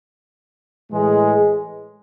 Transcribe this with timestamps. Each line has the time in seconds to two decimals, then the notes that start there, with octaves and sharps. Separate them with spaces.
0.90 A2 E3 G#3